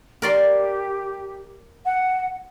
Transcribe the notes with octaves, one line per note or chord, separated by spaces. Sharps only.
G4 A#4 D5 C6
F#5